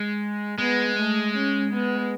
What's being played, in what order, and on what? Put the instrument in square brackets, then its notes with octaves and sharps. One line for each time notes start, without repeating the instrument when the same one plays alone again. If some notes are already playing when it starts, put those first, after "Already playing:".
Already playing: [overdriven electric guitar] G#3
[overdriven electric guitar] G#3 [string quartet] B3
[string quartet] A3
C#4
B3